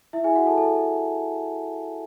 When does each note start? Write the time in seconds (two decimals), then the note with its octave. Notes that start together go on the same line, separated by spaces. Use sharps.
0.13 E4 E5
0.24 G#4 G#5
0.36 F#4 F#5
0.47 A4 A5
0.58 A4 A5